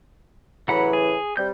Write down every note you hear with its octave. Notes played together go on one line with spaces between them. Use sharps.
A2 C#3 E3 F#3 F#5 B5
G#4
C3 G3 G6